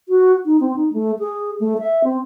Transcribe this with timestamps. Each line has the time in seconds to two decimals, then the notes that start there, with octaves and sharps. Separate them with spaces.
0.09 F#4
0.45 D#4
0.60 C4
0.76 D#4
0.93 A3
1.19 G#4
1.60 A3
1.78 E5
2.04 C4